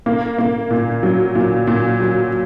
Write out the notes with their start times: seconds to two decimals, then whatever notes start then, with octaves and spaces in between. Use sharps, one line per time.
0.06 A#3
0.38 A#3
0.70 A#2
1.03 F#3
1.35 A#2
1.67 A#2
2.00 F#3